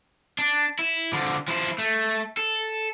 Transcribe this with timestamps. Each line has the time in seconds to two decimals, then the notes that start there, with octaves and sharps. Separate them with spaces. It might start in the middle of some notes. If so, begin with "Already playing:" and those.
0.39 D4
0.79 E4
1.13 D3 F3
1.48 F3 E4
1.78 A3
2.37 A4